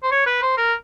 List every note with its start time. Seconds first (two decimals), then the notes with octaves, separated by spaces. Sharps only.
0.03 C5
0.11 C#5
0.26 B4
0.42 C5
0.57 A#4